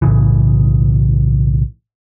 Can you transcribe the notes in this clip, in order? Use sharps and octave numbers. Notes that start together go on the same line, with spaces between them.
B1 A2 C#3 E3